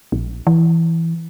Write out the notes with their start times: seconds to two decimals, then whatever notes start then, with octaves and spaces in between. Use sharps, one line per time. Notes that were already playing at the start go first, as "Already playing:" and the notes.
0.12 A#1
0.47 E3